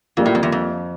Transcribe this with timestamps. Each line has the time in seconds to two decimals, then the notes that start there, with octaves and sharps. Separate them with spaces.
0.17 F2 G3 A#3 F4
0.26 A2
0.35 F2
0.43 E2
0.52 F2